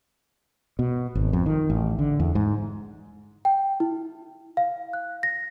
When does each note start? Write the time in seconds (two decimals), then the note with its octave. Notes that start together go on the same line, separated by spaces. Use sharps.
0.79 B2
1.15 G#1
1.33 F2
1.46 D#3
1.70 A1
1.99 D3
2.20 E2
2.35 G#2
3.45 G5
3.80 E4
4.57 F5
4.93 F#6
5.23 A#6